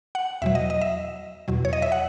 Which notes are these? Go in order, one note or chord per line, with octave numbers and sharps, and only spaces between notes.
F#5
E2 B2 F#3 E5
D#5
D#5
E5
E2 B2 F#3
C#5
D#5
E5
F#5